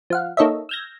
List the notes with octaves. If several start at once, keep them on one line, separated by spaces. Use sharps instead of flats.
F3 F5 F#5
A#3 D#4 A4 C#5 D#5 E5
E6 F6 G6 G#6 A#6